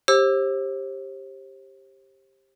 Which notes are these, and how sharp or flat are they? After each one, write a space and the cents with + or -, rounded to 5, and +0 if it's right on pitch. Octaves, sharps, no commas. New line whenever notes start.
G4 +5 C5 +35 E6 +0